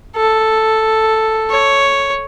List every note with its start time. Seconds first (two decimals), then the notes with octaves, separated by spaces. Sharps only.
0.16 A4
1.50 C#5